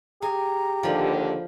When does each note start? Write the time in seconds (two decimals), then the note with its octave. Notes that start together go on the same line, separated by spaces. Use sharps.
0.22 G4 G#4 A#5
0.83 D#2 D3 F3 B5